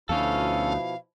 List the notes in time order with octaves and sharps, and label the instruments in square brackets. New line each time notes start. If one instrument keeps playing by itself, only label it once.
[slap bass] D2 [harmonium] B2 F3 E4 [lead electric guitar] C#4 A4 [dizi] F5